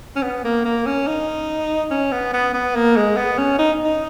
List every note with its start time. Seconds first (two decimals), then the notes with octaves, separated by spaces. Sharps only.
0.16 C#4
0.23 B3
0.44 A#3
0.65 A#3
0.86 C#4
1.07 D#4
1.91 C#4
2.12 B3
2.33 B3
2.54 B3
2.75 A#3
2.97 G#3
3.17 B3
3.38 C#4
3.59 D#4
3.85 D#4